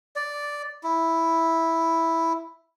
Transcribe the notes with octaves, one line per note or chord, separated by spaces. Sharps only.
D5
E4